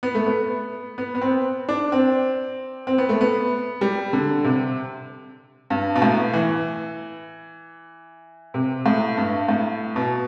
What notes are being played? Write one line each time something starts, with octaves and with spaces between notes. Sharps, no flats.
B3
A3
B3
B3
B3
C4
D4
C4
C4
B3
A3
B3
G3
D3
C3
G2
B2
A2
E3
C3
A2
G2
A2
B2